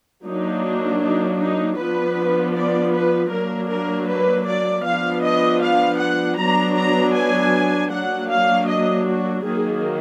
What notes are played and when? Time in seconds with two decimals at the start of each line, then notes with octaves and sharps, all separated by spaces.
0.24 F#3 A#3 D4 D#4
1.02 D#4
1.40 D#4
1.78 F3 B3 D4 B4
2.55 D5
2.94 B4
3.31 F#3 A#3 D4 A#4
3.70 A#4
4.09 B4
4.47 D5
4.84 F3 B3 D4 F5
5.24 D#5
5.62 F5
6.00 F#5
6.38 F#3 B3 D4 A#5
6.76 A#5
7.15 G#5
7.91 F#3 A#3 D4 F#5
8.30 F5
8.68 D#5
9.07 F#4
9.45 D#3 F#3 A#3 G#4